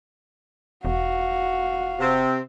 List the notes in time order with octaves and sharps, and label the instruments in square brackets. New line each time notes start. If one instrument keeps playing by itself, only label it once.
[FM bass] E1 [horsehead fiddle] F#4 F5
[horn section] C3 C4